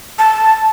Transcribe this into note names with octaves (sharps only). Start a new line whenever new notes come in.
A5